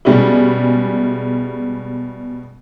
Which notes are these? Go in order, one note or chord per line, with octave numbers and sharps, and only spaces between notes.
B2 G3 G#3 C#4 E4